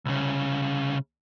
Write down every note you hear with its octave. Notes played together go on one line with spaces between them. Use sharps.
C2 C#3